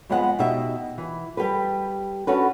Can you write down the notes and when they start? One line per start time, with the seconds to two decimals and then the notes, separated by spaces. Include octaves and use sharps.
0.09 F2 G#3 B3 B4 D#5 F#5
0.39 B2 D#4 G4 D#5 E5
0.98 E3
1.37 G3 G4 A4 B4
2.27 C#4 D4 F#4 A4 B4